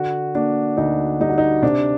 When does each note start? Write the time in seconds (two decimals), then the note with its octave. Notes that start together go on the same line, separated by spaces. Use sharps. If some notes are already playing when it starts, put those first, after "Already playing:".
Already playing: D3 F#4
0.35 A#3 D4
0.77 D2 D#4
1.20 G3 D#4
1.29 F#4
1.38 D#4
1.62 C3 D4